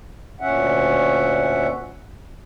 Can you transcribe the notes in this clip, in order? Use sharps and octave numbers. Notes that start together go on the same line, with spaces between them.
D2 A#2 C#4 E5 F#5